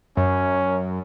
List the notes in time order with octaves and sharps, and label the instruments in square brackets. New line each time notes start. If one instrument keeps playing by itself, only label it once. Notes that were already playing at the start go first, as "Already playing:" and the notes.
[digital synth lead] F#2 [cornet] C#4